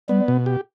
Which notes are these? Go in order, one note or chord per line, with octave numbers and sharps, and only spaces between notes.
G3 B3
B2
G4